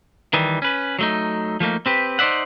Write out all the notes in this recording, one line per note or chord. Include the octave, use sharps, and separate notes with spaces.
D#3 E3 G3
C#4 B4
F#3 A3 D#4
F3 A3 A#3 D#4
C4 G4 B4
D#4 C5 D5 E5 F#5